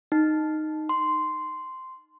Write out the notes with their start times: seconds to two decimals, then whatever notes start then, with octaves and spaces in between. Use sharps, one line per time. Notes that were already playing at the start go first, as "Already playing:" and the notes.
0.12 D#4
0.89 C6